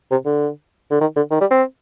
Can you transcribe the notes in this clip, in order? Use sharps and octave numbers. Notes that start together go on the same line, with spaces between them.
C3
D3
D3
D#3
D3
D#3
G3
C4